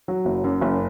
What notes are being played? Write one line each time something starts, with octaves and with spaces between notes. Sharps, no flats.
F#3
F#1
F#2
F#1